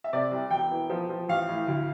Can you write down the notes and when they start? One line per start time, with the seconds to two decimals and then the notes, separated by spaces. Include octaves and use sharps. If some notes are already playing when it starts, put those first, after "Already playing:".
0.04 E5
0.13 C3 D5
0.31 C2
0.51 E1 G5
0.70 E3
0.90 F3
1.09 F3
1.29 A1 F5
1.49 A2
1.67 D2